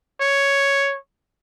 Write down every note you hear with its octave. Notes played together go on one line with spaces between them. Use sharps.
C#5